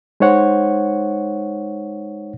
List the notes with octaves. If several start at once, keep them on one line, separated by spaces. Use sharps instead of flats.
G#3 D#4 C5 C#5 F#5